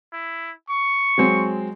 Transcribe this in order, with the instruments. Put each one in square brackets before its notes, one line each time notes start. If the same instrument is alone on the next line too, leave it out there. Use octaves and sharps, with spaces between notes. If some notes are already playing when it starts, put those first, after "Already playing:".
[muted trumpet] E4
C#6
[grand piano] F#3 G#3 C4